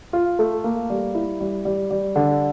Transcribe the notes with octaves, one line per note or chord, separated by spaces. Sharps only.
F4
A3
A#3
G3
E4
G3
G3
G3
D3